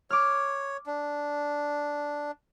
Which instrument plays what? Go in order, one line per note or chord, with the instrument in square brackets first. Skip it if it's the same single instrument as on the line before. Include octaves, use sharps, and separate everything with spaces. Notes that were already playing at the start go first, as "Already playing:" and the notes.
[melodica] C#5 [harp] D6 F6
[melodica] D4